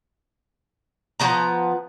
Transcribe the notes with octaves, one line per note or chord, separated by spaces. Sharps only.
F3 B3 A#5